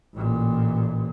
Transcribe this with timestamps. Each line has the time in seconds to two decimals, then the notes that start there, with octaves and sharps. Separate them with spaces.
0.14 A1 A#2